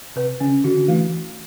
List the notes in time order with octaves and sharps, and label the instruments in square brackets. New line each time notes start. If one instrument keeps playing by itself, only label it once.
[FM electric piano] C3 [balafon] B4
[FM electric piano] C#3 [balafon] C#4
[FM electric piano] D3 [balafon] F#4
[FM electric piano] E3 [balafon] A3